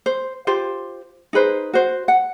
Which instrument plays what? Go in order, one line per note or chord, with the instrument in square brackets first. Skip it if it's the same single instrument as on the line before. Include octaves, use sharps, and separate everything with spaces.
[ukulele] C5
F4 G4 C5
D#4 G#4 B4 C5
F#4 C5
F#5